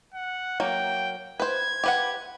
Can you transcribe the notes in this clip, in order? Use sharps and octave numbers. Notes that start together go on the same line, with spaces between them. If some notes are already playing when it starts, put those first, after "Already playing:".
F#5
F#3 A#3 G5
B4 C5 G#6
G4 B4 F#5